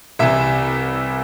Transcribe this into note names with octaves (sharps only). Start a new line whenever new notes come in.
C2 C3 E3 E5